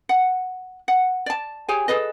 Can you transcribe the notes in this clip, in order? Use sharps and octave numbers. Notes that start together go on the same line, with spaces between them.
F#5
F#5
D5 A5
G4 G#4 C#5 G#5
G#4 A4 B4 D#5